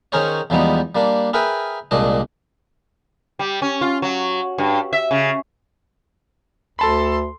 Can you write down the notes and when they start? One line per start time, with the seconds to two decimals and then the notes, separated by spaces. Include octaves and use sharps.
0.12 D#3 C#4 G#4 A#4 C5 C#5
0.50 E2 F3 G3 G#3 B3 D#4
0.95 G3 A#3 D4
1.33 G#4 A#4 B4 E5 G5 G#5
1.91 C2 A#2 G#3 D4 D#5
3.39 G3
3.62 C#4
3.81 F4
4.02 F#3
4.58 G2
4.93 E5
5.11 C#3
6.79 D2 A4 A5 B5 C6